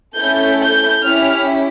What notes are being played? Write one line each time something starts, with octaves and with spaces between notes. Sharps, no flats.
A3 C#4 E4 A4 G6
G6
C#4 E4 G4 F6